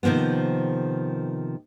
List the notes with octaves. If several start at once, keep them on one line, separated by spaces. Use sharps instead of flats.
C3 D#3 F3 A#3 B3